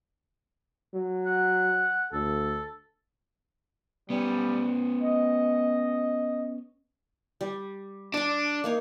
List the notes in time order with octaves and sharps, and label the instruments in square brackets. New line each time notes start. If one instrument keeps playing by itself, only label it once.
[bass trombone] F#3
[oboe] F#5
[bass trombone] D2 [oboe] A4
[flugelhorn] G3 [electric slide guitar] B3 C#4
[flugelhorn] D#5
[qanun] G3
[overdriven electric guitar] D4 [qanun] D5 A5
[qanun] A#3 D#4 C#5